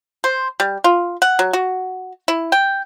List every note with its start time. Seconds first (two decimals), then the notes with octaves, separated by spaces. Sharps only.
0.24 C5
0.60 G3
0.84 F4
1.22 F#5
1.39 F#3
1.53 F#4
2.28 E4
2.52 G5